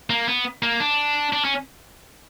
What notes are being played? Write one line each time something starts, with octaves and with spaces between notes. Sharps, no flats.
A#3
B3
A#3
D4
D4
C#4